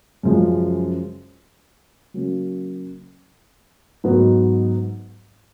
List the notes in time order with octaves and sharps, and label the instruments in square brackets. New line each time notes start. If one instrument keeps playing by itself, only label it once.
[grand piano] F#2 C#3 F3 G#3
C#3 F#3 A#3 C#4
G#2 F#3 B3 D#4